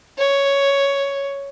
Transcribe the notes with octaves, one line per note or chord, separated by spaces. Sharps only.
C#5